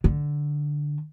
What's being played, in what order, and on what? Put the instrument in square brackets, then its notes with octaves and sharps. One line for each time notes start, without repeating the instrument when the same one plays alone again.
[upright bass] D3